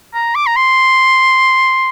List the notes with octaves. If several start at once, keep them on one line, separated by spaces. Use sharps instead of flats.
A#5
D6
A#5
C6